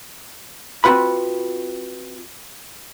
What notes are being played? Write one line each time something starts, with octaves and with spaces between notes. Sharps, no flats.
C4 F4 F#4 B4 B5